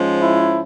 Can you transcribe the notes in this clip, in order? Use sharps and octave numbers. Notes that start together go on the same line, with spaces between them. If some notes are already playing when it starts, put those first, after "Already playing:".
Already playing: G#2 F3 G#3 C#4
E4